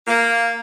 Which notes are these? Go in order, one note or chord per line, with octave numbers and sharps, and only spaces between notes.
A#3